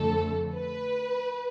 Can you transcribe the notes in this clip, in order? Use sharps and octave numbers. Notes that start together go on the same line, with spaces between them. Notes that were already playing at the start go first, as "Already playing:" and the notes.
Already playing: F2 D3 A3 A4
B4